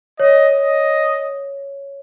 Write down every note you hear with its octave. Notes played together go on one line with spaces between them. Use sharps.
C#5 D#5
D#5